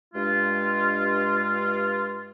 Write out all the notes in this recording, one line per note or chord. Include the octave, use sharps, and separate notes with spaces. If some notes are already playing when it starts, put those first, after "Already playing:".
G2 G#3 F4